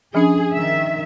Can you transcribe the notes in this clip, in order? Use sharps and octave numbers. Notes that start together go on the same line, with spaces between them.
F3 C#4 D4 G#4
D#3 E5